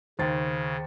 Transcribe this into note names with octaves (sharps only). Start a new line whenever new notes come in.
D#2 C#3 C5 A6